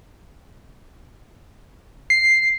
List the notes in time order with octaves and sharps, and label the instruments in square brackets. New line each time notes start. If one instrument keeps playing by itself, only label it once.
[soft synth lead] C7